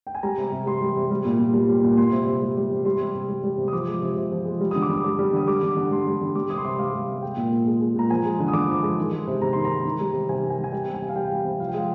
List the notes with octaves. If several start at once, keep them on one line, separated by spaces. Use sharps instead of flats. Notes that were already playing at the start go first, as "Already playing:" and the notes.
G5
G#5
G3 A#5
C3
C3
G3 C6
G3
C3
G3
A#2
A#2
G3
G3
A#2
G3 C6
C3
C3
G3
G3
C3
G3 C6
C3
C3
G3
G3
C3
D#6
F3 D6
G#3
C3
C3
F3
G#3
G3
D3 D#6
D6
D3 D#6
G3
G3
D3 D#6
G3 D6
D3
D3
G3 C6
G3
D3
G3 D6
C3 D#6
C6
C3 D6
G3 F5
G3
C3
G#3 G5
A#2
A#2
G#3
G#3
A#2 A#5
F3 G#5
G#3
D3
D#6
D3 D6
F3
G#3
D#3
G#3
C3
C3 A#5
D#3 C6
A#5
G#3
D#3
G3
C3
C3 G#5
D#3
G#5
G3
G#5
G3 G5
C3
G#5
C3
F5
G3 G5
G3
C3
F3 F5
G5
G#3 F5